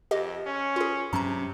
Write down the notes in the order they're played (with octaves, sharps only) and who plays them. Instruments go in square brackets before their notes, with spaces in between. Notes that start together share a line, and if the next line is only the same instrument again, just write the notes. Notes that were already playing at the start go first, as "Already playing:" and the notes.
[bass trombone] F2 [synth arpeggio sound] G4 D#5
[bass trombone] C#4
[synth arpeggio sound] F4 G#4
[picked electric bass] G2 F#3 C#4 [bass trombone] C3 [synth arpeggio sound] A5 A#5